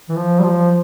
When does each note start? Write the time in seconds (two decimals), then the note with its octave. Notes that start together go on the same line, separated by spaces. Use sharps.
0.09 E3
0.16 F3
0.39 G3
0.44 F3